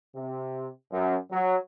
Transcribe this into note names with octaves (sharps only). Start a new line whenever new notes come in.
C3
F#2
F#3